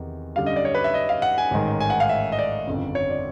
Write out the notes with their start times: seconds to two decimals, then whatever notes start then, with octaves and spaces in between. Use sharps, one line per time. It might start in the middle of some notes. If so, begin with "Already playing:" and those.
Already playing: E2 C3 D#3
0.36 F#2 D3 G3 F5
0.46 D#5
0.56 D5
0.65 C#5
0.75 B4
0.84 E5
0.94 D#5
1.09 F5
1.22 F#5
1.38 G#5
1.51 A1 G#2 D#3
1.80 G#5
1.90 F#5
2.00 F5
2.09 E5
2.32 D#5
2.39 D5
2.67 G1 F2 C#3
2.95 C#5
3.10 D5